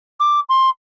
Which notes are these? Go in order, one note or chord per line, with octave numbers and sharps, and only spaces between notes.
D6
C6